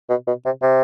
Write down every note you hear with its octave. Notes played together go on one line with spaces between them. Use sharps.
B2
B2
C3
C3